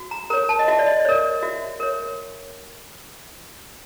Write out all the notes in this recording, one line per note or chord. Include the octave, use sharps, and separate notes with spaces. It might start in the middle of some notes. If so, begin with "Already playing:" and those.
Already playing: F#4
A#5
A#4 C#5 A#5
A5
D#5
F#4 E5
D5
D#5
D#5
A#4 C#5 D5
F#4 E5
A#4 C#5